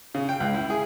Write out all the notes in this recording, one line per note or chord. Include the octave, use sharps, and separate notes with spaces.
C#3
G5
C#2
E4
G#4